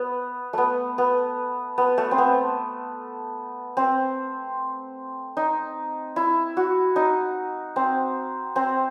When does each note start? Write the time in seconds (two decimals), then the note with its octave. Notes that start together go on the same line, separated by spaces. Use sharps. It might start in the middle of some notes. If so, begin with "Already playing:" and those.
Already playing: B3
0.53 A3 B3
0.98 B3
1.78 B3
1.98 A3
2.11 C4
2.18 B3
3.77 C4
5.37 D#4
6.16 E4
6.57 F#4
6.96 D#4
7.76 C4
8.56 C4